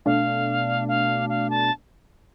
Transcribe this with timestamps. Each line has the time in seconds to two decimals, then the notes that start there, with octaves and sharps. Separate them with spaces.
0.06 B2 A3 D4 F5
0.88 F5
1.29 F5
1.50 A5